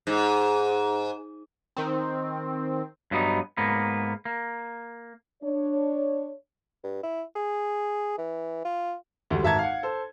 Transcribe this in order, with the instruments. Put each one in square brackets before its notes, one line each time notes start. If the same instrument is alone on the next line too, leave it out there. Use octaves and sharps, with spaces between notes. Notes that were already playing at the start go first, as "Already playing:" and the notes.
[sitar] G#2
[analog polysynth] D#3 C4
[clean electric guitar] G2 F#3 B3 C#4 D#4
G#2 A#3 B3
A#3
[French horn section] D4 C#5
[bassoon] G2
E4
G#4
E3
F4
[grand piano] D2 D3 G3
G#1 F#4 E5 A5 A#5 G#6
F5 F#5
A4 C5